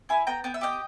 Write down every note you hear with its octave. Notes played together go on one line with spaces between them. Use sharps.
E4 G#5 B5
B3 G5 A#5
B3 G5
E5
G4 D#5 G5